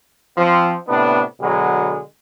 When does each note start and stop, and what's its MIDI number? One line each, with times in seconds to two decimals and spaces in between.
0.36 0.75 53
0.36 0.75 60
0.88 1.22 45
0.88 1.22 48
0.88 1.22 59
0.88 1.22 62
1.40 2.00 47
1.40 2.00 50
1.40 2.00 54
1.40 2.00 56